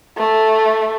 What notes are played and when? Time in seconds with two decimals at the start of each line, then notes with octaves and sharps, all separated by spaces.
0.18 A3